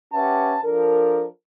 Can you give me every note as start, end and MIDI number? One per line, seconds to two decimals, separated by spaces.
0.13 0.57 61
0.13 0.57 67
0.13 0.57 71
0.13 0.57 76
0.13 0.57 78
0.13 0.57 81
0.64 1.26 53
0.64 1.26 62
0.64 1.26 69
0.64 1.26 70